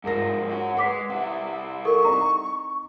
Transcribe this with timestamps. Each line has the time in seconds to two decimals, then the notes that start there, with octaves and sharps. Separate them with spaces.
0.04 C2 G#2 F3 A#4 A#6
0.49 C#4 F#4
0.77 G#3 B4 F#5 D6 B6
1.10 C3 E4 F#5
1.85 A4 A#4 C#6
2.05 C4 D#4 A#5